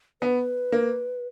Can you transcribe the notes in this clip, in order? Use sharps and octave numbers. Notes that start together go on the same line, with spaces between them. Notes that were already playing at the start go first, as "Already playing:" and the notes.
B3 B4
A#3